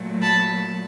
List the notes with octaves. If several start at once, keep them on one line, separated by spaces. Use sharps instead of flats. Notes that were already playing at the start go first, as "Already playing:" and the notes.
Already playing: A#2 F#3 A3
A5 B5